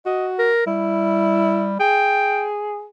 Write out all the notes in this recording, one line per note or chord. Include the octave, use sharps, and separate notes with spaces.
F#4 D#5
A#4
G3 E4
G#4 G5